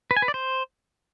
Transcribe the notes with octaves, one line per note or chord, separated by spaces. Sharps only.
B4
G#5
B4
D5
C5